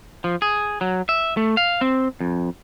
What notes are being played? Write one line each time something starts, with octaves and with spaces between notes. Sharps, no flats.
F3
G#4
F#3
E5
A3
F5
C4
F2